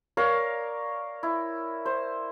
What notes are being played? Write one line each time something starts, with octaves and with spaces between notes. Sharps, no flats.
A#4 C#5 D5 F5
E4
C5